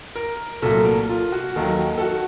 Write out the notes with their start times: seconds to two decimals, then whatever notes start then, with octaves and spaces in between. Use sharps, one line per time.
0.15 A#4
0.62 C2 A#2 F#3 A3 A4
0.85 A#4
1.09 F4
1.32 F#4
1.56 D#2 D#3 F#3 A4
1.98 A4
2.02 F#4